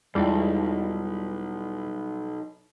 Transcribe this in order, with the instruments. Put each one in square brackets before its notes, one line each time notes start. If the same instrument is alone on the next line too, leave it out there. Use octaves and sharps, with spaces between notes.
[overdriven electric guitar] B1 [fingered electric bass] E2 G#3 [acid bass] G3 [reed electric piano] E4 F4 G#4